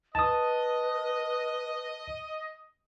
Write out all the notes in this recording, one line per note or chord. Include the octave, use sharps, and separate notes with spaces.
B4 D#5 A5 D#6